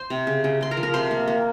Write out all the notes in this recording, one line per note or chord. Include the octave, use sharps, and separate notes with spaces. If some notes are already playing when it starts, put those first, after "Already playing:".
Already playing: C5 C6
C3
C#3
C#3
C#3 C6
A#4 A#5
F3
A#4 A#5
C3 C5 C6
A#3
A#3